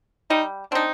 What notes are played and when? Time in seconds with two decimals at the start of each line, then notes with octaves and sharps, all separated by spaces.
0.30 G3 D#4
0.71 C4 D4 D#4